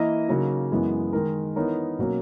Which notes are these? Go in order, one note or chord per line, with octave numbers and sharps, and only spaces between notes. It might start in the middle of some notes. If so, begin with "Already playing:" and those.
Already playing: E3 A#3 E4 A#4 D#5
C#3 F#3 A#3 D#4
F#2 E3 G#3 B3
D#3 G#3 D#4 A#4
E3 B3 D#4 A#4 C#5
B2 F#3 A#3 C#4